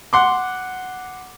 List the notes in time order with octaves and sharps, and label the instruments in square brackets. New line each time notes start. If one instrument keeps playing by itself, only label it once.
[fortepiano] F#5 C6 D6